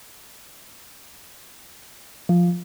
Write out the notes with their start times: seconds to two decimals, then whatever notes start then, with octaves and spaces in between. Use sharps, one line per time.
2.29 F3